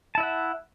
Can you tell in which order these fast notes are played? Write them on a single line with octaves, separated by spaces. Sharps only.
A5 E4 E5 F#5